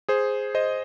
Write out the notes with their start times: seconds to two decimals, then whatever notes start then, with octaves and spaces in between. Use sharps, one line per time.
0.09 G#4 C5
0.55 C5 D#5